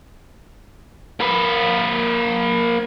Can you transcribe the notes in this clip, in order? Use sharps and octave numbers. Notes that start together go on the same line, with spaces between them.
A#3 B4